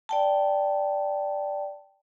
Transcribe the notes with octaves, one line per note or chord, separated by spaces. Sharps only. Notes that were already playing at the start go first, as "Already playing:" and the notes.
D5 G5 A5